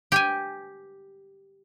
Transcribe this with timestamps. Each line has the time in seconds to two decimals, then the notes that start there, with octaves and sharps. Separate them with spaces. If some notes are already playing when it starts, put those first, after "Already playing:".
0.12 G4 G5 G#5